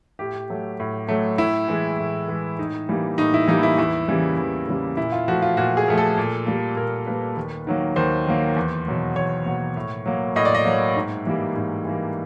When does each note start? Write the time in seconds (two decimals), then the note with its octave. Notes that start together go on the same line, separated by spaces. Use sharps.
0.19 A2 G4
0.50 F#3 A3
0.80 A2
1.08 F#3 A3
1.38 A2 E4
1.68 E3 G#3
1.99 A2
2.28 E3 G#3
2.59 A2 D#4
2.89 E3 G3 A#3
3.18 A2 D#4
3.34 E4
3.48 E3 G3 A#3 D#4
3.63 E4
3.78 E2 E4
4.08 C#3 E3 G3 A#3
4.38 E2
4.68 C#3 E3 G3 A#3
4.97 A#2 E4
5.12 F4
5.28 F3 A3 F#4
5.42 F4
5.57 A#2 F#4
5.77 G#4
5.88 F3 A3
5.98 A4
6.18 A#2
6.47 G3 A#3
6.76 A#2 A#4
7.07 G3 A#3 B4
7.37 D#2
7.67 D#3 F#3 A#3
7.96 D#2 C5
8.27 D#3 F#3 A#3
8.56 E2
8.87 B2 F#3 A#3
9.16 E2 C#5
9.45 B2 F#3 A#3
9.76 A2
10.06 F#3 A#3
10.36 A2 D#5
10.45 D5
10.55 D#5
10.65 F#3 A#3
10.96 G#2
11.26 E3 G3 A#3
11.56 G#2
11.85 E3 G3 A#3